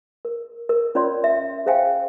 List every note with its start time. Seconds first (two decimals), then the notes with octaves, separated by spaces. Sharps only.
0.25 A#4
0.69 A#4
0.95 C#4 F4 C#5 D5 C6
1.24 E5
1.66 G#4 C5 E5 F5 G5 G#5